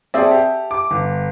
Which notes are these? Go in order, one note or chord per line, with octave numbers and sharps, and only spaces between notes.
C4 G#4 A4 D5 E5
G4
D6
G1